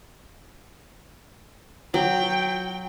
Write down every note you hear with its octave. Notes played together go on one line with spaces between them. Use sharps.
F#3 G5